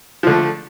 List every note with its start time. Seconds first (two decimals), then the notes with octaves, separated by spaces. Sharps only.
0.23 F3
0.27 D3
0.30 A3